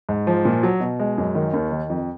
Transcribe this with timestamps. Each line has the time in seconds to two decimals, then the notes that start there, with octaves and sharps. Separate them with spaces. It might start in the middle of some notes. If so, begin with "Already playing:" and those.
0.09 G#2
0.27 F3
0.45 A#2
0.63 F#3
0.80 B2
1.00 G#3
1.18 F#2
1.35 D#3
1.54 D#2
1.72 D#3
1.90 F2